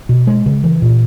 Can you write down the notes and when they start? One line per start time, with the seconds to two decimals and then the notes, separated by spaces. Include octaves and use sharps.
0.09 B2
0.27 G#3
0.46 C#3
0.64 E3
0.82 A#2